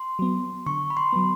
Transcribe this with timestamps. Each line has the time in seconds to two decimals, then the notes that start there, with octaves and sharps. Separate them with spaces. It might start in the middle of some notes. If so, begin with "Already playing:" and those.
Already playing: C6
0.19 F#3 B3
0.66 D3 C#6
0.90 B5
0.97 C6
1.13 F#3 B3